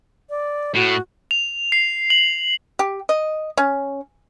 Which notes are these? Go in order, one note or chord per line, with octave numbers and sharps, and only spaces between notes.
D5
A2 F#4
F7
C7
F#7
G4
D#5
C#4